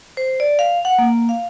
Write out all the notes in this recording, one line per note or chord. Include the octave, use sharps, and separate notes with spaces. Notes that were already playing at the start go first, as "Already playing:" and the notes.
C5
D5
F5
F#5
A#3
F5